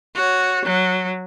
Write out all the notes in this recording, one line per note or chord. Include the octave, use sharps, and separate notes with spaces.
F#4 C#5
F#3